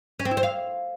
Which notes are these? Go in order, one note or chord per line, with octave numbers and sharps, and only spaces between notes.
C#4
C4
E4
C5
F5